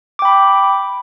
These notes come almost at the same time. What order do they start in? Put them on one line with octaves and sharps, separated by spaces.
D6 G5 B5